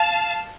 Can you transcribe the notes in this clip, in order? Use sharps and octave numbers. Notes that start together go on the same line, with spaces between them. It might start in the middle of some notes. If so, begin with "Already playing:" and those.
Already playing: F5 A5